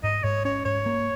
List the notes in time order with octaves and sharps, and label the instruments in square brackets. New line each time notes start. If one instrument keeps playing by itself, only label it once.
[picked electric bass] G#2 [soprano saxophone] D#5
[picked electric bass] G#2 [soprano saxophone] C#5
[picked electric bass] C#4 [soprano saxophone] C#5
[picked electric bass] G#2 [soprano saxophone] C#5
[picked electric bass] A#3